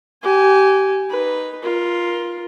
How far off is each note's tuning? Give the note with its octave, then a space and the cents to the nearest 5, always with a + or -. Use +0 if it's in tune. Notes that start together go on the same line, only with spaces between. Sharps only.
G4 -25 G#5 +0
D#4 +0 B4 +0
F4 +0 A#4 +25